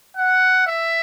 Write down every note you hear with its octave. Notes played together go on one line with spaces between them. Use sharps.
F#5
E5